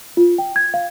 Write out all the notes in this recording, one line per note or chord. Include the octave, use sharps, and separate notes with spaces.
F4
G5
G#6
F5